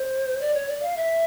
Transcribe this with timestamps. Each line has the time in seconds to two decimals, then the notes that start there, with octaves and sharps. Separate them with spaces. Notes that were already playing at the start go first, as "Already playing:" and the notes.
Already playing: C5
0.41 D5
0.54 C#5
0.68 D5
0.82 F5
0.97 E5